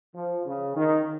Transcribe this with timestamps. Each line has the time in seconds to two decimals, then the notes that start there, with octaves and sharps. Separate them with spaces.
0.15 F3
0.46 C#3
0.76 D#3